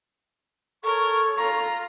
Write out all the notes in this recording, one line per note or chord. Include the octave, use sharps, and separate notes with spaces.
A4 A#4 C#5 C#6
F4 A#5